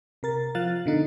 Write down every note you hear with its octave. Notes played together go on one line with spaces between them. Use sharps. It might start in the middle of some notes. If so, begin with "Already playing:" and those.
C3 A#4 A6
F3 F5 F#6 A6
B2 D3 D#4